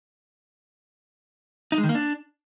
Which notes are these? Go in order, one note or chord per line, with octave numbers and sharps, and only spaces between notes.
D#4
G#3
D#3
A#3
D4